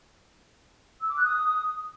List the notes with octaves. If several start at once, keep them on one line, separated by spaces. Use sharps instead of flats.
E6
D6
F#6
D#6